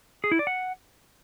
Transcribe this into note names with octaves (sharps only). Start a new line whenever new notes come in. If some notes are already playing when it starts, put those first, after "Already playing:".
G#4
E4
D5
F#5